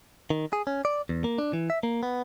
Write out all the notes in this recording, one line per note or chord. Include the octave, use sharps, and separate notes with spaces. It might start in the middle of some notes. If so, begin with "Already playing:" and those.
D#3
G#4
C#4
D5
E2
A#3
D4
E3
E5
A#3
B3